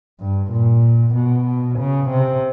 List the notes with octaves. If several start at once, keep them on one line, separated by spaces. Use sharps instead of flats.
G2
A#2
B2
C#3
C3